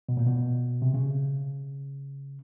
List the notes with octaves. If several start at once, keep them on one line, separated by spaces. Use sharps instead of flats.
B2
A#2
B2
C3
C#3